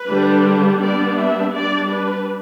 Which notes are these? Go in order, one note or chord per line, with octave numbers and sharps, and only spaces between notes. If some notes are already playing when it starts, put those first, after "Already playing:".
Already playing: B4
D3 G3 D4
G3 B3 D4 D5
E5
G3 D4 D5
B4